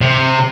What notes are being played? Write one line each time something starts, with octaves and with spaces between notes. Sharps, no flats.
C3